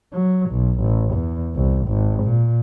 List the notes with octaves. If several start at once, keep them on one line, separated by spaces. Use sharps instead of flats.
F#3
B1
A1
E2
C2
G#1
A#2